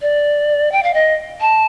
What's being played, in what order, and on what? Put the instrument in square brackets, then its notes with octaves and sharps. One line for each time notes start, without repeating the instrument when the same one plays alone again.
[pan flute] D5
G5
F5
D#5
A5